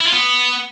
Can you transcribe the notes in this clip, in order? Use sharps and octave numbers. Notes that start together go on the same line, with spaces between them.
E4
F4
B3